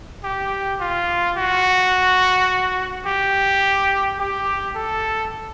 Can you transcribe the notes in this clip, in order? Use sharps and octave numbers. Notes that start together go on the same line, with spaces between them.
G4
F4
F#4
G4
G4
A4